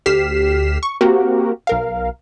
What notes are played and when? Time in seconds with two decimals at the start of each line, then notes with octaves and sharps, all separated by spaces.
0.06 D2 G4 F6 B6 C7 E7
0.83 C#6
1.01 A#3 C4 F#4 G4 A#4
1.67 B1 A#4 F5